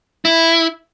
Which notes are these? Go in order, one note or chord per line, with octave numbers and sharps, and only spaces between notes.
E4